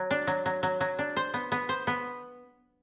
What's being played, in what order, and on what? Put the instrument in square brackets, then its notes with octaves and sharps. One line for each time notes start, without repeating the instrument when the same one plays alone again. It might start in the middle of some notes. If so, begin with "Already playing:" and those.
Already playing: [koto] F#3
D4
F#3
F#3
F#3
F#3
D4
C5
B3
B3
C5
B3